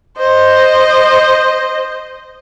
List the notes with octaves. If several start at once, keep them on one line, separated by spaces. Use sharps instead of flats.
C5 D#5